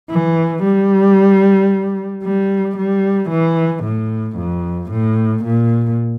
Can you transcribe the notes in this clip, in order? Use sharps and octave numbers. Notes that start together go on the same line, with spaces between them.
E3
G3
G3
G3
E3
A2
F2
A2
A#2